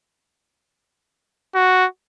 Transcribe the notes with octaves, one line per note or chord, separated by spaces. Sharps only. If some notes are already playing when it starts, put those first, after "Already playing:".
F#4